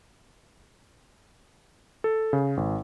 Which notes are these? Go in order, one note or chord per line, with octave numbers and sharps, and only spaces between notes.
A4
C#3
G#1